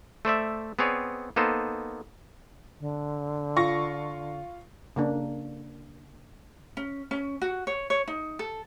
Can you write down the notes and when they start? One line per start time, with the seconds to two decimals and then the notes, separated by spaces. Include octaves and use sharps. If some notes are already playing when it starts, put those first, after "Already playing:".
0.25 A3 C5 D5 E5
0.79 B3 C4 G#4 C#5 D5
1.36 A#3 B3 D#4 A4 C5
2.80 D3
3.56 F4 C#6 A#6
4.96 C#3 A#3 D4
6.77 C#4
7.11 C#4
7.42 F#4
7.67 C#5
7.90 C#5
8.08 D#4
8.39 A4